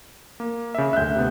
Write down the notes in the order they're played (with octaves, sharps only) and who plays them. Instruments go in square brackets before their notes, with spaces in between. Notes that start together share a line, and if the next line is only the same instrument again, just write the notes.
[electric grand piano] A#3
C#3 E5
[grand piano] D2 E5 [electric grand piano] F#6 G6
[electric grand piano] C3 B3